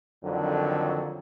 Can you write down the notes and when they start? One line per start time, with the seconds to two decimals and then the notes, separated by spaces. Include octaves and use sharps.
0.24 F2 D3 D#3 F#3